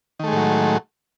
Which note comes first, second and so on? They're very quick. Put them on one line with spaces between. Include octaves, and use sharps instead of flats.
D#3 A3 G#3 A2 F#3